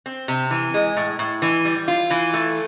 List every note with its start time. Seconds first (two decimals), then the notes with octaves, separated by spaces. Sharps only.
0.06 C4
0.28 C3
0.51 E3
0.74 G#3
0.97 A2
1.19 A2
1.42 E3
1.65 G3
1.88 F4
2.10 E3
2.33 A3